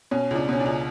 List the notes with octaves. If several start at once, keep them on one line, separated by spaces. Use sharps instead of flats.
B2 C#4
C#2 D4
B2 C#4
D4
C#2